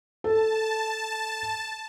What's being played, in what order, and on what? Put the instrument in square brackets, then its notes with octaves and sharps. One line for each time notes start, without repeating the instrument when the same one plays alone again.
[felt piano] A4 [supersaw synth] A5